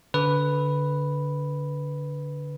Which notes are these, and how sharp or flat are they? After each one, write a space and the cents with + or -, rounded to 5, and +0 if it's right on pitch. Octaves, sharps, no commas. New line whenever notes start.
D3 -20 B4 +0